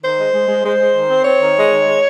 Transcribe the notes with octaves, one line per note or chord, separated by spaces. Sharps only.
D#3 C5
G#3
G#3
G#3
G#3 C5
G#3
D#3
C4
C4 C#5
D#3
G#3
D#3
G#3